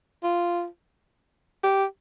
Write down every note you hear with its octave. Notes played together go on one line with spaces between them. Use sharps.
F4
G4